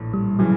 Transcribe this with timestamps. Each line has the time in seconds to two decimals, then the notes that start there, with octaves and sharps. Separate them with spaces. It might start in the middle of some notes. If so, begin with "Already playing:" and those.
Already playing: A#1 A2 E3
0.13 G3
0.39 C#3 E3 F#3